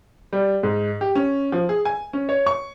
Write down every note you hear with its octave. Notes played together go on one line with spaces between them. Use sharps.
G3
G#2
G4
C#4
F3
G#4
G#5
C#4
C#5
C#6